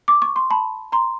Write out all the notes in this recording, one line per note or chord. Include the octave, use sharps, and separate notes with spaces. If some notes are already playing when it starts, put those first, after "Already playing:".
D6
C#6
C6
A5 B5
A#5 C6